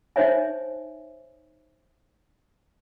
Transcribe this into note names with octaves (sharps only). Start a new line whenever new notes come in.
D#4 C5 C#5 D#5 E5 G#5